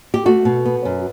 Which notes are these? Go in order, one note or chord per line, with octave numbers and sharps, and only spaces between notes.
G4
A3 F#4
B2
B3
F#2